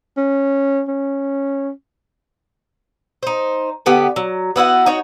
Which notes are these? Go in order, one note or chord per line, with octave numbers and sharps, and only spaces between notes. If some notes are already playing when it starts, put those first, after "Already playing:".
C#4
C#4
D#4 C5
D3 B3 G4
F#3
B3 E4 F#4 F#5
D#4 F#4 C#5